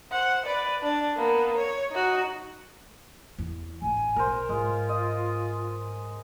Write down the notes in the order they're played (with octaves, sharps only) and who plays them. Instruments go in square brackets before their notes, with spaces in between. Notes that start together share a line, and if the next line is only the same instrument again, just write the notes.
[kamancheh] C5 F#5
B4 D5
D4 D5
A#3 B3
C#5
D#4 F#4
[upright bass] E2
[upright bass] A1 D3 [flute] G#5
[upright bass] B1 [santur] A#4 C5
[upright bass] G#2 [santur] G#3 [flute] F4
[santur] D#5